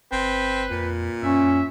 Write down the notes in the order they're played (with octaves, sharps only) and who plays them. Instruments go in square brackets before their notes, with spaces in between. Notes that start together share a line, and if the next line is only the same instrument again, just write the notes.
[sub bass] G1 [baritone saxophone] C4 [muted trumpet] B4
[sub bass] F2 [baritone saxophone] A#2
[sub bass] F#2 [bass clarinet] C#4 [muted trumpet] E5